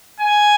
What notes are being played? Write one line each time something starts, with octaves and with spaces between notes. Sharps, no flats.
G#5